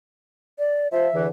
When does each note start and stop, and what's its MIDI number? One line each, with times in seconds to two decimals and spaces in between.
0.59 0.88 74
0.92 1.07 53
0.92 1.07 72
0.92 1.24 76
1.13 1.28 40
1.13 1.28 50
1.13 1.28 52